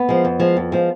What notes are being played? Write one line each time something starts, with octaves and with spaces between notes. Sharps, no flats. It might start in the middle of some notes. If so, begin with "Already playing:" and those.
Already playing: B3
F3 G#3
F2
F3 G#3
F2
F3 G#3